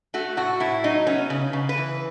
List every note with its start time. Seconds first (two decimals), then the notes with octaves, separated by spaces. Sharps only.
0.14 A3 F#4
0.37 A2 F#4
0.60 A2 E4
0.84 F#3 D#4
1.07 B3 C#4
1.30 C#3
1.53 C#3
1.69 B4
1.77 E3